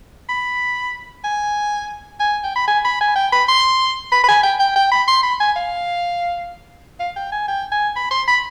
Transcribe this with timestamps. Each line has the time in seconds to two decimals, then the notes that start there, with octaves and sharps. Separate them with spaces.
0.29 B5
1.24 G#5
2.20 G#5
2.44 G5
2.56 B5
2.68 G#5
2.85 B5
3.01 G#5
3.16 G5
3.32 B5
3.48 C6
4.12 B5
4.24 B5
4.28 G#5
4.43 G5
4.60 G5
4.76 G5
4.91 B5
5.08 C6
5.23 B5
5.40 G#5
5.56 F5
7.00 F5
7.16 G5
7.32 G#5
7.48 G5
7.72 G#5
7.96 B5
8.11 C6
8.28 B5